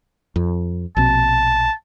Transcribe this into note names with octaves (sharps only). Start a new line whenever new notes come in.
F2
A#1 B2 C4 A5